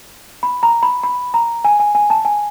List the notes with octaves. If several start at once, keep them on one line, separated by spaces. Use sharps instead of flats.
B5
A#5
B5
B5
A#5
G#5
G#5
G#5
A5
G#5